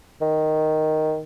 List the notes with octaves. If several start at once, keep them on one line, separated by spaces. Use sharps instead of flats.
D#3